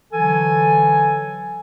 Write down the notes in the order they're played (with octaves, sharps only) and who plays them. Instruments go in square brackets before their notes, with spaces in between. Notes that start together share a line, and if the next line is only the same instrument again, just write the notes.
[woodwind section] D3 E3 F#3 A4 G#5